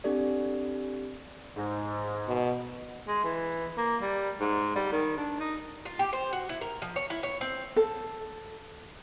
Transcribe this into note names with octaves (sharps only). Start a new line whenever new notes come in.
C4 D4 G4 A4 D5
G#2
B2
G#3
E3
A#3
G3
G#2
G3
D#3
D4
D#4
F4
G4
C5
F#4
E4
A#4
F3
C#5
E4
C#5
C4
A4